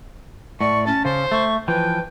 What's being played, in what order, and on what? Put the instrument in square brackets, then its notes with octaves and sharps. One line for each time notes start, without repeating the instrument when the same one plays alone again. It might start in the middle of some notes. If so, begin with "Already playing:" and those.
[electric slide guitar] A2 [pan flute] D5 [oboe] C#6
[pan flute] C#4 [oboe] A5
[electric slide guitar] C#3 [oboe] C5
[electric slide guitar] A3 [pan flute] C#6
[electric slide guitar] E3 F3 [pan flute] B4 [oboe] G5